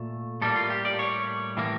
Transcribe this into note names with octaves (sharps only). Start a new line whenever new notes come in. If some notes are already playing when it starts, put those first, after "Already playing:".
Already playing: A#2 A3
A2 G3 A#3 A4
F4
G4
D5
C#5
A2 E3 A#3